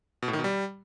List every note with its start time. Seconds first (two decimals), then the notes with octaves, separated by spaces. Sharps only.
0.22 B2
0.28 A2
0.33 D#3
0.39 B2
0.44 G3